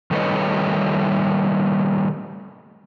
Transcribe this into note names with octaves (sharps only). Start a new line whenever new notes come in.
D#3 G3 A3 B4 C#5 D#5